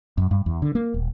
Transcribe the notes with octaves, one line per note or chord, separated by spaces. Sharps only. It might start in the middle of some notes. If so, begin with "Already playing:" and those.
F#2
G2
E2
D3
A#3
D#1